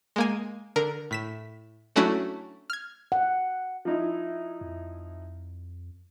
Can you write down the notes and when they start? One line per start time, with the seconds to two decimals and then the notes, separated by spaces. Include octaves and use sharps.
0.16 G#3 A#3 G#5
0.76 D3 A#4
1.11 A2 B6 E7
1.96 F#3 A3 C#4 D4 E4 F#4
2.70 F6 G#6
3.12 F#5
3.85 F3 D#4 E4
4.61 F2